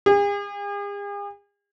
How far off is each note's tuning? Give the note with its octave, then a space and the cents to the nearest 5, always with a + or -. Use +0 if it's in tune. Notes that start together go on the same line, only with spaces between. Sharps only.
G#4 -45